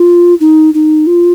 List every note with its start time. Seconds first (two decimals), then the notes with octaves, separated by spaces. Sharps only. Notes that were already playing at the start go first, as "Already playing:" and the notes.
Already playing: F4
0.41 D#4
0.74 D#4
1.07 F4